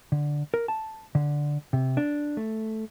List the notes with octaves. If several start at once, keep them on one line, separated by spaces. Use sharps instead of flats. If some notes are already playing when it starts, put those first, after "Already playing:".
D3
A#4
A5
D3
C3
D4
A3